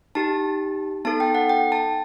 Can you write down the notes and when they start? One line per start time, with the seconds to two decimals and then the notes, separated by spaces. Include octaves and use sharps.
0.15 D#4 G4 A5
1.05 B3 D#4 A4 A5
1.20 G5
1.35 F#5
1.49 G5
1.72 A5